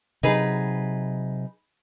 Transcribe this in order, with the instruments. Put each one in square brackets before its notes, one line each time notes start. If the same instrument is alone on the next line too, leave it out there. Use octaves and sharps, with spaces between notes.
[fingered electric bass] C3 F#3 [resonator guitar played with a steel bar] D#4 G#4 B4